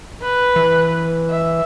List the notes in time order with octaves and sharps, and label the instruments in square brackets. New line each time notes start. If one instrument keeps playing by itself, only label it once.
[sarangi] B4
[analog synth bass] E3
[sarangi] E5